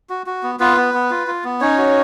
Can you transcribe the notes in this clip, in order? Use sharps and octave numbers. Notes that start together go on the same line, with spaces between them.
F#4
F#4
B3
B3 F4 B4
B3
B3
F4
F4
B3
C#4 D#4 C#5
F#4